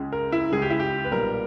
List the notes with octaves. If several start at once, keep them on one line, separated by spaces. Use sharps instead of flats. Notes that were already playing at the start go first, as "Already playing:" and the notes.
Already playing: C#2 C#3 G#3
A#4
E4
C#2 C#3 G#3 G#4
G4
E4
G4
B4
B1 A#2 G3 A#4